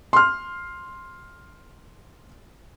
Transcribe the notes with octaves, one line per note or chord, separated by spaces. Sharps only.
C6 F6